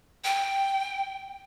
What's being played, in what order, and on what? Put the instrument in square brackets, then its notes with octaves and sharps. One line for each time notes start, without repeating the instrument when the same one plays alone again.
[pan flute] G5